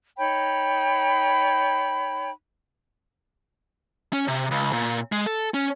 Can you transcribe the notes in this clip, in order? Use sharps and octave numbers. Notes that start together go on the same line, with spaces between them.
D#4 C#5 G5 B5
C#4
C3
C#2
A#2
G#3
A4
C#4